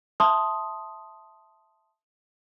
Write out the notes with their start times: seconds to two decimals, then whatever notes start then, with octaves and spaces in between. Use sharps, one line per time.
0.20 E5 A5 C6 D#6